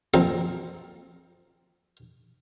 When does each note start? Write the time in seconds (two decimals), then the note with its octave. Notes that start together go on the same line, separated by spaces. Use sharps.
0.14 A#1 F3 C4 F5 A#5